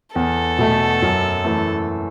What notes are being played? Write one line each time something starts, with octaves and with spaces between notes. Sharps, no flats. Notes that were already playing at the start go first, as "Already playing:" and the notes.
E2 A4
B2 A3
F#2
E3 A3